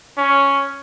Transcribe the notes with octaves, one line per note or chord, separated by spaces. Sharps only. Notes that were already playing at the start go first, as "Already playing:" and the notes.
C#4